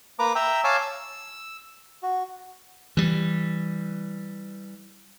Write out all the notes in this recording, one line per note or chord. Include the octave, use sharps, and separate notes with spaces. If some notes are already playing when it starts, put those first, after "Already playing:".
A#3 B4 A#5 D6
E5 G5 A#5 E6
C#5 F5 G#5 A5 D6 E6
E6
F#4
E3 G3